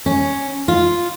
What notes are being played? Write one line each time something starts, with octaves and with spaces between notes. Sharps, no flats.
C#4
F4